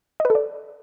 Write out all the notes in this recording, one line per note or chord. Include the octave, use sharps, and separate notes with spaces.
D#5
B4
A4
D5